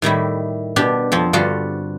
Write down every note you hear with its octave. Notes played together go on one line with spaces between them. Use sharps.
A2 D#3 G3 E4
B2 D4 G4
F2 F3 C4
G2 D3 G3 F4 F#4